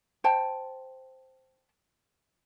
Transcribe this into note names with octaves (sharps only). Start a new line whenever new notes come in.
C5 G5 A5